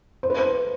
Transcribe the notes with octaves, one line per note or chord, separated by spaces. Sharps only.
C5
B4
C5